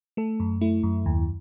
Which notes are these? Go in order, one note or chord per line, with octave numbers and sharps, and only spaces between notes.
A3 A4
F#2
A3 E4
F#2
D#2